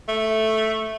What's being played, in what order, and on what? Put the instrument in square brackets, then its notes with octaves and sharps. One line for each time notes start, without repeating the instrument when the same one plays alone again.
[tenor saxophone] A3